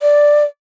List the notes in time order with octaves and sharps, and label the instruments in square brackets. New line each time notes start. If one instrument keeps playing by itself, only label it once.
[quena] D5